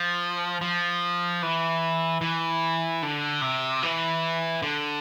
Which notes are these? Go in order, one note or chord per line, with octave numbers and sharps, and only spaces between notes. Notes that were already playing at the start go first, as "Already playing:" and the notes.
Already playing: F3
F3
E3
E3
D3
C3
E3
D3